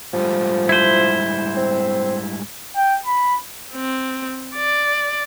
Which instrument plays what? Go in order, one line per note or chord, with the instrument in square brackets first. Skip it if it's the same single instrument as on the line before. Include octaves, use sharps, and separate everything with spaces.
[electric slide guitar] G#2 G3 A3 [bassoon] F3
[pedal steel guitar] E4 C5
[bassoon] C4
[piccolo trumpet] G5
B5
[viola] C4
D5